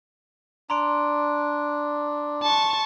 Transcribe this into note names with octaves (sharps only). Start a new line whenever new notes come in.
D4 A#5 C6 D7
A5 C#6